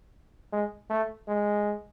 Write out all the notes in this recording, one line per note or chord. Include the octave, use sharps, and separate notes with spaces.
G#3
A3
G#3